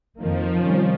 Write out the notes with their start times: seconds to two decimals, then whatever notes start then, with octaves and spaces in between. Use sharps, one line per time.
0.18 F2 D#3 F3 A#3
0.62 C3 D#3 G3 C#4